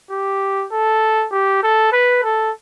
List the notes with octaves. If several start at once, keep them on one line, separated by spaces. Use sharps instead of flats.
G4
A4
G4
A4
B4
A4